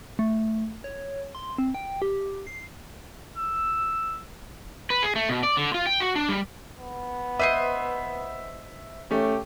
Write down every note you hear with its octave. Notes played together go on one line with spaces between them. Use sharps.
A3
C#5
C6
C4
G5
G4
C7
E6
B4
G#4
A3
B2
D5
D3
F4
G5
F#4
D4
G3
B3
B4 C5 D#5 E5
A3 C#4 G4